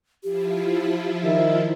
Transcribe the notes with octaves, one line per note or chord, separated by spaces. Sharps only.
F3 E4 F4 G4
D#3 E5